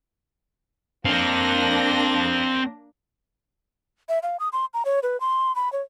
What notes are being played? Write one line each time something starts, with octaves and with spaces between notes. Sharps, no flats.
A#3 C4 D4 F5 A#6
E5
F5
D#6
C6
A#5
C#5
B4
C6
B5
C#5